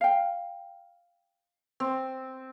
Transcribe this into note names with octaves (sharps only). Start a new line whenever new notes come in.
F5 G5
C4